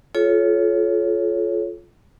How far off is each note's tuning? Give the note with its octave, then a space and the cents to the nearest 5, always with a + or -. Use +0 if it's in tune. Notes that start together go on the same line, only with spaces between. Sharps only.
F4 +0 A4 -40 C#5 +0